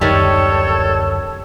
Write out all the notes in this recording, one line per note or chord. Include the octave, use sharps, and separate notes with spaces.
D1 F#2 D#3 G3 A4 C#5